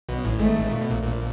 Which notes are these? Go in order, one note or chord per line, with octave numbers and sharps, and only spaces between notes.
B1 B2
A1 A2
G#1 G#2 A3
A#2
B2
A#1 A#2
A#1 A#2